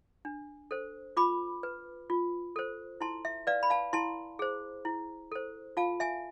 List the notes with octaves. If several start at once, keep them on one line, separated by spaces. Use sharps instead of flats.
D4
A4 C5
F4 B5 D6
B4
F4
A4 C5
E4 A5 C6
E5
B4 D5 F5
B5
F5 A5
E4 A5 C6
G#4 C5
E4
A4 C5
F4 F5 A5
E5 G#5